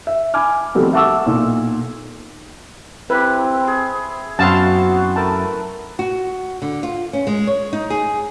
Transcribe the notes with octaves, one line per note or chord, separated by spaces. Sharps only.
E5
G#5 B5 D6 F6
D#3 F3 G3 A3 B3 C4
E5 F#5 A5 C#6 D6 E6
B1 A#2
C4 E4 G4 B4
G#4
F#2 B3 C4 F#4 F5 A5 C6
A3 A#4 B4 A5
F#4
D3
F4
C#4
G#3
C#5
D#4
G#4